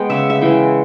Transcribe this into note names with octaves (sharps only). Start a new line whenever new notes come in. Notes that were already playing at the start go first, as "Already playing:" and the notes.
Already playing: G#3 B3 G5
C#3 E5
E5
E3 G#3 G5